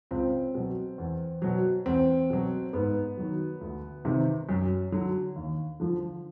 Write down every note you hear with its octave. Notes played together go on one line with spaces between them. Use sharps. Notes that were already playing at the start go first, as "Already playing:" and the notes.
C#2 C4
B2 F#3
E2
B2 F#3
E2 C4
B2 F#3
G#2 B3
D#3 F#3
D2
C3 D#3
F#2
D3 F#3
D#2
D3 F3